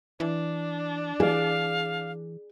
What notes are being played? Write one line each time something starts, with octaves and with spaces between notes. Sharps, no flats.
E3 D4
E3 G#4 D5 F5